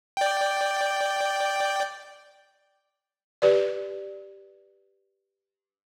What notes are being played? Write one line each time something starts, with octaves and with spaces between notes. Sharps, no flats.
D5 G5
G4 B4 D5